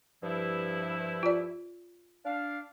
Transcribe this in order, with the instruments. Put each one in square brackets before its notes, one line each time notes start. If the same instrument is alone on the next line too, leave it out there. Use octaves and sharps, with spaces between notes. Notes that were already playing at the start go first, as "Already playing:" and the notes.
[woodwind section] G2 F3 E4
[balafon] F4 D5
[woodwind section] D4 F5